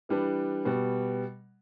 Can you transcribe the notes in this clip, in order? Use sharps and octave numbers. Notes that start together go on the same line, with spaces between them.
E3 G3 D4 B4
B2 G3 B3